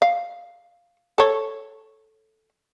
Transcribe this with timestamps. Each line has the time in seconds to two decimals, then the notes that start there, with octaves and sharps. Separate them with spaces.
0.02 F5
1.18 A4 C#5